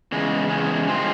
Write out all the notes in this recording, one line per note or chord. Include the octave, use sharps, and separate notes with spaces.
E2 C#3 G#3
E2 C#3 G#3
G2 F3 G#3 C4 F4